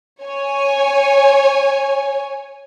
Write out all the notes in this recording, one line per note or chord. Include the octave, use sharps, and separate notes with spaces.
C#5 G#5